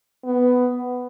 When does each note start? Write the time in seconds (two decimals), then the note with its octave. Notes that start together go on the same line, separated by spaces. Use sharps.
0.25 B3